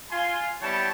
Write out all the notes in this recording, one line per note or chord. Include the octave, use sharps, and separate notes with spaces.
F4 G#5 C6
G3 B3 E4 C#5 G5 A5